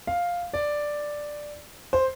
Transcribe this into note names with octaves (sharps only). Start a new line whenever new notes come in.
F5
D5
C5